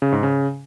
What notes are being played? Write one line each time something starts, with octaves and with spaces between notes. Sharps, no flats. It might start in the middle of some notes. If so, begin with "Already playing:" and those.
C#3
G#2
C#3